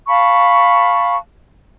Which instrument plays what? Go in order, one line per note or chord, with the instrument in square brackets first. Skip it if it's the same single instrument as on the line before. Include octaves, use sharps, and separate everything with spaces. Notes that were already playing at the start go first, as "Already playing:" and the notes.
[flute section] F5 A5 B5 C#6